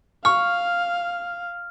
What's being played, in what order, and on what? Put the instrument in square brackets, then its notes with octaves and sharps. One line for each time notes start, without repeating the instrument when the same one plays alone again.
[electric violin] F5 [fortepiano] C#6 [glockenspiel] F6